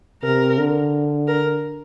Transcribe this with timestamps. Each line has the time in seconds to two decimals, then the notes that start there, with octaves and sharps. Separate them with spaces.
0.22 C3 A#4
0.58 D3
1.28 A#4